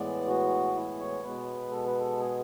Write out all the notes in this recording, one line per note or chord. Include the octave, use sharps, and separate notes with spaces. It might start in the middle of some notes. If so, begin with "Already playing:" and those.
Already playing: A2 E3 G#3 B3 D5
F#4
E4
C#5
B2 G#3 B3 B4
A4
B4
A4
G#4